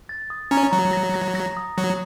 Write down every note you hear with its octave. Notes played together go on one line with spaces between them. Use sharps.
A6
D#6
C#4 A#5
F#3 A#5
A#6
A#6
A#6
D#6
F#3 A#6